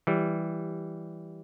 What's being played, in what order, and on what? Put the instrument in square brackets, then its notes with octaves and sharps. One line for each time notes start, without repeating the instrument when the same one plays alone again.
[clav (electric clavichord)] E3 G3